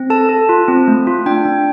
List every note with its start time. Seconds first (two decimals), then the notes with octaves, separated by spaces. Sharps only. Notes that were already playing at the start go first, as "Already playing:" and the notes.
Already playing: C4
0.10 A4 A5
0.29 A4
0.49 F4
0.68 C4
0.88 A3
1.07 F4
1.26 D4 G5
1.45 D4